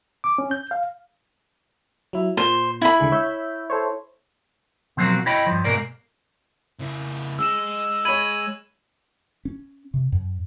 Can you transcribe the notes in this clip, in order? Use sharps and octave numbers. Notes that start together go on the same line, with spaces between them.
D6
C#4
G6
F5
F#3 E4
A#2 C5
E4 B5
C#2 D3 G#4
C#5 E5 G6
A4 C5 C#5
B2 F3 F#3 A#3 C4 F#4
E4 C#5 D#5 G5 B5
G2 F3
G#2 B2 A#3 A#4 D5
C#3 E4
G#3 E6 E7
C#5 B5 G#6 D#7 F#7
C#4
C3
F#2